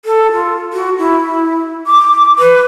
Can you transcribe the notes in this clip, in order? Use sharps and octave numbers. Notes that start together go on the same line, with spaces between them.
A4
F4
F#4
E4
D6
B4